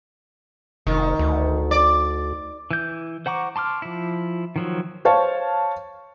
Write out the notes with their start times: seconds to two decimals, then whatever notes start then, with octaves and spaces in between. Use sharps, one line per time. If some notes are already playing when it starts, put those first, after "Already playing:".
0.87 F1 D#3
1.19 D2
1.71 D5
2.71 E3 G6
3.26 C5 F#5 A#5 C#6 D6
3.56 A5 C6 D6 F6
3.82 F3 E4
4.56 D#3 F3 F#3
5.05 C5 C#5 F5 A5